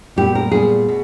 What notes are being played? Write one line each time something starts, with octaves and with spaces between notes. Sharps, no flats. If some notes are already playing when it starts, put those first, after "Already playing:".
A#2 G3 B3 G4
A#4
A#2 G3 B3 G#4
B2